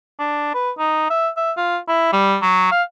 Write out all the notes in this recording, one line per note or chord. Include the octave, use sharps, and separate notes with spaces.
D4
B4
D#4
E5
E5
F4
E4
G3
F#3
F5